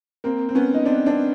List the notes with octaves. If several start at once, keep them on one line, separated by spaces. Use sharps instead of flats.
A#3 C4
C4
B3 C#4
D#4
C4 D4
C4 D4